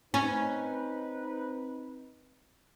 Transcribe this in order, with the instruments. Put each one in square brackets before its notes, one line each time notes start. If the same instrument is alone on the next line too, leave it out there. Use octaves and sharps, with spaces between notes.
[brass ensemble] C4 D#4 B4 [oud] C#4